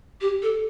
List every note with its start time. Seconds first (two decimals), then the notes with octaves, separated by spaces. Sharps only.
0.21 G4
0.42 A4